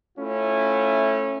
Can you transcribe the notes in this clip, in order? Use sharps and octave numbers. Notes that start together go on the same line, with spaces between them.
A3 C#4 E4 F4